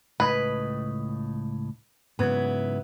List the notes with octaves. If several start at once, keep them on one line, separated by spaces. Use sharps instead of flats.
C#2 A2 B4 D#5
G#2 C#3 F#3 B3 E4